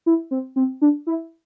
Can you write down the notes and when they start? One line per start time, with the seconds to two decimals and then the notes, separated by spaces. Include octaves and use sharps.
0.06 E4
0.31 C4
0.56 C4
0.82 D4
1.07 E4